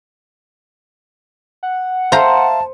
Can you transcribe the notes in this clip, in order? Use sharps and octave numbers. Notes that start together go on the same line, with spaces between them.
F#5
C5 E5 F5 A5 A#5 C6